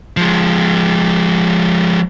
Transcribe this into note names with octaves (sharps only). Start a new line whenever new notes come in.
F3 G#3